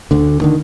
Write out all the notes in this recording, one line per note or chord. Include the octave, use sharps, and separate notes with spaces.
D2 D3
D3 D#3